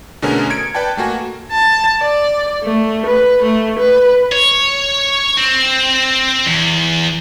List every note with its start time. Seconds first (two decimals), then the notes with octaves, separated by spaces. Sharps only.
0.22 B2 D3 A3 C#4 G#4 A#4
0.50 G#6 C#7 D7
0.74 B4 D5 G5 A5
0.97 A3 A#3 F#4 G#5
1.52 A5
2.01 D5
2.63 A3
3.06 B4
3.42 A3
3.79 B4
4.32 C#5
5.38 C4
6.46 E2